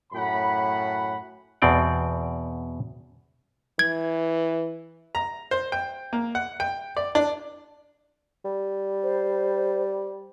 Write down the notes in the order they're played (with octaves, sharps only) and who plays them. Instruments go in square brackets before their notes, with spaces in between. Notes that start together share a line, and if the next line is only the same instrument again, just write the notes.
[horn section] F#2 A2 F#5 B5
[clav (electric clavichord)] E2 B2 C4 D5 G5
[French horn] E3 [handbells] G#6
[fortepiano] A#5
C5
G5
A#3
F#5
G5
D5
D4
[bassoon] G3
[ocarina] C5